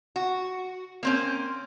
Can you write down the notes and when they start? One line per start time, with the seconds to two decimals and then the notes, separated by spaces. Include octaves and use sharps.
0.16 F#4
1.03 A#3 C4 C#4